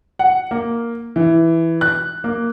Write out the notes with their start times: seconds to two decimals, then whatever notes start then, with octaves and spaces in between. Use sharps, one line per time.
0.19 F#5
0.51 A#3
1.16 E3
1.81 F#6
2.24 A#3